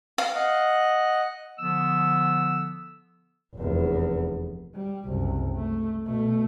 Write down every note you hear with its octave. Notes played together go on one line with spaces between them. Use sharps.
F5
D#5 F#5
D3 F3 B3 E6
F1 E2
G3
F#1 C2
A3
B2 A3